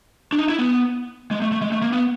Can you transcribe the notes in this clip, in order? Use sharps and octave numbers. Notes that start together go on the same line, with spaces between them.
D4
D#4
E4
B3
G#3
A3
A3
G#3
A3
A#3
B3